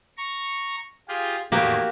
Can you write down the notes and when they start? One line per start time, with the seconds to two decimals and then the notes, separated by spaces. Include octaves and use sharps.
0.18 A#5 C#6
1.08 F4 G4 G#4
1.52 E2 A2 D#3 A#3 F#4 G4